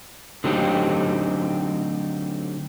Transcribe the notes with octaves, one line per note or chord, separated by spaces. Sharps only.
D3 F#3 A3 C4 D#4 G4